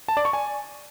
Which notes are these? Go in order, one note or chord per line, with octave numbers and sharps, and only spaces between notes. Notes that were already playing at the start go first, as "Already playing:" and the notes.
A5
D5
C#6
G#5